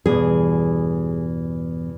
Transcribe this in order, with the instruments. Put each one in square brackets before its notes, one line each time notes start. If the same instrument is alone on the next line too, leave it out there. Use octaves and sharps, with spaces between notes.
[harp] E2 G2 B2 [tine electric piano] E3 B3 [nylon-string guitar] G#4